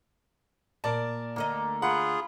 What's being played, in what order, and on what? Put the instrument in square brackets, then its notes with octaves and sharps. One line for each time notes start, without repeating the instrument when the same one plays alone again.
[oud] A#2 [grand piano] A#4 D5 A5
[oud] D2 D3 D#5 [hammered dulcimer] A#3
[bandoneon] F4 G#4 [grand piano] F#5 [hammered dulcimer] B5